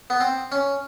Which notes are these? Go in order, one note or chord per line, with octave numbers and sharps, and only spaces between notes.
B3
C4
C#4